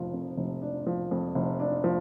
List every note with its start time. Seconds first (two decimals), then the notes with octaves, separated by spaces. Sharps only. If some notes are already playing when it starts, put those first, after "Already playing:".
Already playing: F1 F3 D4
0.13 F2
0.37 F1
0.62 D4
0.87 F3
1.11 F2
1.35 F1
1.60 D4
1.84 F3